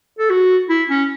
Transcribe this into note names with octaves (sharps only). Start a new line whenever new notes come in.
A4
F#4
E4
C#4